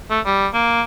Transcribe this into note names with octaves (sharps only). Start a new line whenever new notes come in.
A3
G3
A#3